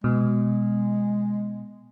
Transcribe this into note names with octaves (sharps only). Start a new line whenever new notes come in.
B2 G#3